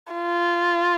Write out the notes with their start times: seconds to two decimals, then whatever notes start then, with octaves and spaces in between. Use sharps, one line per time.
0.13 F4